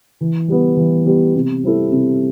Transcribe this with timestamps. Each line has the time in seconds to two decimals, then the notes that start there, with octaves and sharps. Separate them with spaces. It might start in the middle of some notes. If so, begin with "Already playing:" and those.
0.21 E3
0.48 G3 B3
0.77 E3
1.06 G3 B3
1.35 C3
1.63 G3 C4 E4 A4
1.92 C3